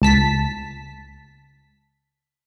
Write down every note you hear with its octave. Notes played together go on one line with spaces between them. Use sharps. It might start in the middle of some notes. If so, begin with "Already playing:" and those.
C#2 A5 B6